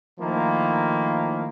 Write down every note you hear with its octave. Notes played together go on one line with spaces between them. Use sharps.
D#3 F3 A3 A#3 E4